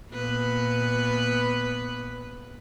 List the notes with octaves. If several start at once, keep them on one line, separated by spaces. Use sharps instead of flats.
A#2 B3 B4